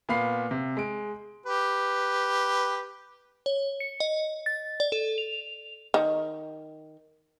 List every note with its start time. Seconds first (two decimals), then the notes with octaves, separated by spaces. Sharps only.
0.09 A#2 B3 F5 B5 C7
0.51 C3
0.77 G#3 D7
1.46 G4 B4
3.46 C#5
3.80 C#7
4.00 D#5
4.46 A6
4.80 D5
4.92 A4
5.18 F7
5.94 D#3